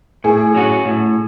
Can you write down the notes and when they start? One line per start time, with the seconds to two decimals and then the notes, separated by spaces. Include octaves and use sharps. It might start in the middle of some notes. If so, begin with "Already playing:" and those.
0.24 A2 G#4
0.55 F#3 C#4 F#4
0.85 A2